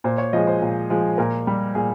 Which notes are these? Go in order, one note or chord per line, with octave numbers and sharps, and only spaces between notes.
A#2 C5
C#5
F3 G#3 D#5
C5
A#2
F3 G#3
A#2 A#4
G3
A#2 G#4